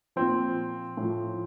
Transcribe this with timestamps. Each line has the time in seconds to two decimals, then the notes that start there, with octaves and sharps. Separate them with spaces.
0.16 A#2 F3 C4
0.97 A2 F3